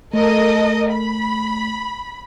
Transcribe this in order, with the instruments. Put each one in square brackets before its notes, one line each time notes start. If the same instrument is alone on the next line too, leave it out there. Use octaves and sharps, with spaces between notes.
[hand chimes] A3 [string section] A4 A#4 D#5
[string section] B5